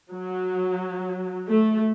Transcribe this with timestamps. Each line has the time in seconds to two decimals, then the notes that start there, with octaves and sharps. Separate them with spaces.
0.13 F#3
1.50 A3